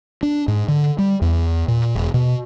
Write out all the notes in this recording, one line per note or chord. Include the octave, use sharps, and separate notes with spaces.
D4
G#2
D3
G3
E2
A#2
E1
B2